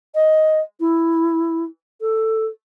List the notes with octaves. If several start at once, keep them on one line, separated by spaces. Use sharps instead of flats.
D#5
E4
A4